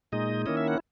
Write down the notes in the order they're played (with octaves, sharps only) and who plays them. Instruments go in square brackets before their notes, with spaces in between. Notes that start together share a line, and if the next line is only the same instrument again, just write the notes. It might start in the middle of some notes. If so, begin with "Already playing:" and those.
[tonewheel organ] A#2 G#3 D#4 D#5
D#3 A#3 C#4 E4 D#5
E5
F#5